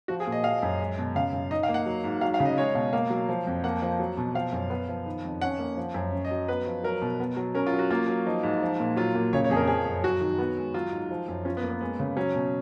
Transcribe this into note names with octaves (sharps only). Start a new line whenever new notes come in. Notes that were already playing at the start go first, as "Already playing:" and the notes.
F3 F#4
G#4
A#2
D#5
F3 F5
F#2
G#3
B2
C#3 F5
F#2
D#4 D#5
F5
A#3
F#5
F#3
G#2
F#3 F5
F5
C#3
D#5
G#3 C#5
B2 F5
A#3 F5
F#3
F3
F2
A#3 F#5
F3
F#3
B2
F3 F5
F#2
B3
F3
D#3
F2
C#4 F#5
A#3
F3
F#2
C#4
D#5
F#3
B3 B4
F3
F#3 A#4
B2
B3
F#3
C#4 A#4
F4
F#3
F#4
A#3 F4
F#3
F3 D#4
G#2
F3
A#2
F#3 F4
A#2
C#3 C#5
C#5
F2 G#4
A#4
F3 G#4
F#2
F#3 F#4
D#3
B3
G#3
F#3 F4
G#2
F3
F#2
C#4 F4
B3
A#3
B3
G#3 B3
C#3
F#3 C#4
B2